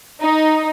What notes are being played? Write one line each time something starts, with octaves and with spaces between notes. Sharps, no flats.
D#4